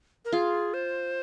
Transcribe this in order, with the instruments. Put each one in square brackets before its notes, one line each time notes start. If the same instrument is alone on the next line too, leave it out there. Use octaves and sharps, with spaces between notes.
[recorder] A#4
[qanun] F4 [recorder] G#4
[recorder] C5